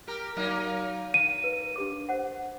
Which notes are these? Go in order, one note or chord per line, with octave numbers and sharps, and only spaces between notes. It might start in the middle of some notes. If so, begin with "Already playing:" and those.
G4 A#4
F#3 A#3 D#4
F5 D#7
B4
D4 G4 D6
C5 F#5